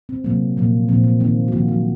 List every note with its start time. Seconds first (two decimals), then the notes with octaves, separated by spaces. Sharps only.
0.09 C4
0.24 C3 F#3 A#3
0.57 A#2 F3 A#3
0.88 A#2 F3 A#3 C4
1.04 A#3
1.20 D#3 A#3 C4
1.48 F#4
1.52 D#3 F3 A#3 F4
1.68 F#3 F#4